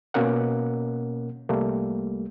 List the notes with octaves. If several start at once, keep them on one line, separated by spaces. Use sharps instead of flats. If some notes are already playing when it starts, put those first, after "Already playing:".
B2 A#3 C#4 A#4 F#5
C2 G3 A3 A#3